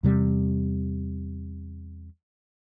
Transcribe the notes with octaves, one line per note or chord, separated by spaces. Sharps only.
E2 C3 G3